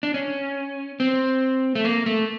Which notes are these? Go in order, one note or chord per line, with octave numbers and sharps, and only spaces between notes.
D4
C#4
C4
A3
A#3
A3